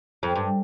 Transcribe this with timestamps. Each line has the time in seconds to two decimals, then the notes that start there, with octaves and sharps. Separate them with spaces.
0.23 F2
0.35 G2